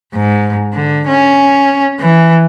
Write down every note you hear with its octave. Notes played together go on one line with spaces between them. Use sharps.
G#2
D3
C#4
E3